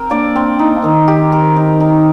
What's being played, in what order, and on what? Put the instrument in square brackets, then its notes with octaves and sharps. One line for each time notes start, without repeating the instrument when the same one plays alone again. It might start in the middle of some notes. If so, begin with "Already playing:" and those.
Already playing: [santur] C4 A#4
[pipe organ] A#3 D4 [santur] D5
[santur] C4
D#4
[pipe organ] D#3 [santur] D#4
[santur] G4
A#4
D#4
D#4